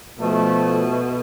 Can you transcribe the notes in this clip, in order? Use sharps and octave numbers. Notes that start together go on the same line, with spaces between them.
B2 F3 A3